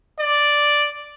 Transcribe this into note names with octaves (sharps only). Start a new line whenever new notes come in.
D5